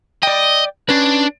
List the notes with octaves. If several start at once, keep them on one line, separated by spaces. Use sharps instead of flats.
D5 D#5 G5
C#4 D4 B4